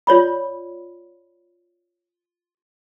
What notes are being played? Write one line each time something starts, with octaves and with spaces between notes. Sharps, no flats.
F4 C#5 D5 B5